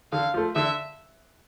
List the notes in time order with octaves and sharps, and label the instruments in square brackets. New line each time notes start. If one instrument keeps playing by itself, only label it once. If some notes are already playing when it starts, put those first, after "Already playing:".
[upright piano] D3 [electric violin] F5
[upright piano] F3 A3
[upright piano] D3 [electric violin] E5